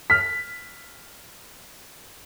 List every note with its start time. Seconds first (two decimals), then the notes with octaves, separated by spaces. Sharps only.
0.10 F6 B6